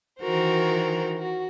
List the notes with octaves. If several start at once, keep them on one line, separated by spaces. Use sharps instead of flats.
D#3 E3 F#4 A#4 C5
F#4